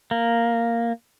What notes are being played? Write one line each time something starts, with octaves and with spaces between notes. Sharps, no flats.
A#3